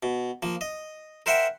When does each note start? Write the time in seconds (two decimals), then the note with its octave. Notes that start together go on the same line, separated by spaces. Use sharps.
0.03 B2
0.43 F3 A#3
0.61 D#5
1.26 A#4 C5 E5 F#5 G5 B5